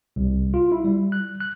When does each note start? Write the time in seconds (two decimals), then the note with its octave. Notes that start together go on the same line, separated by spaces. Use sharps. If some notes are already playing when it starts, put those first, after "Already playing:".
0.16 C2
0.54 F4
0.72 E4
0.84 G3
1.12 F#6
1.40 F#6